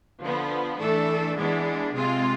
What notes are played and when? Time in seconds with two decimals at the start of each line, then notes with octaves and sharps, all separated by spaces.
0.23 D3 F3 B3
0.79 E3 A3 D4 A4
1.36 E3 G#3 B3 D4
1.92 C3 G#3 C4 F4